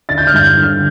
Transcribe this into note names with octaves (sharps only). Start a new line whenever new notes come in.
D3 A6
G6
F6
G2 G6
D3